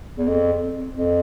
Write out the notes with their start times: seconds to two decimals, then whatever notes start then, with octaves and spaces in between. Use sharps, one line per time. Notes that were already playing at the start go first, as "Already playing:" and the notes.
0.18 E2
0.27 F2
0.96 F2